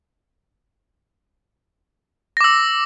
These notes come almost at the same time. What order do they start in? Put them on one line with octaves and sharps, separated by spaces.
A#6 D6 E6